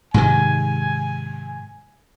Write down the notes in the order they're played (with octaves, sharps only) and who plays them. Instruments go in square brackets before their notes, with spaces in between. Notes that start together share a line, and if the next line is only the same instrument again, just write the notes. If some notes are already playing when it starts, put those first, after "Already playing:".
[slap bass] G#2 C3 D#3 [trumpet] G#5